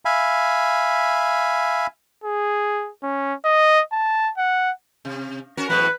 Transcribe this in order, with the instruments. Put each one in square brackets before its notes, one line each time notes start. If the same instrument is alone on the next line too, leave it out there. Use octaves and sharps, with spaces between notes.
[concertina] E5 F5 G#5 B5
[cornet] G#4
C#4
D#5
A5
F#5
[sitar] C3
C#4 F#4 A#4
[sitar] E2 A2 F#3 [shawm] B4